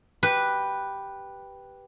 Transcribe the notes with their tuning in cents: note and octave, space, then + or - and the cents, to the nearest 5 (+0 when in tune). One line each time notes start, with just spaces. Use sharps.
G4 +0 B4 -5